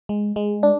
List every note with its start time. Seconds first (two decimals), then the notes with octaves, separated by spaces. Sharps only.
0.09 G#3
0.36 G#3
0.63 D4